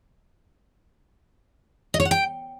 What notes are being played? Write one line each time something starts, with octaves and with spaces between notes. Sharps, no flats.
D#5
C#5
F#5
G5